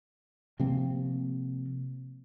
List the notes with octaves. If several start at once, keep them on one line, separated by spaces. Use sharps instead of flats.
C3 F3 A#3 C4